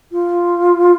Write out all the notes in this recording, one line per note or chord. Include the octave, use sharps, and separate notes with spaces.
F4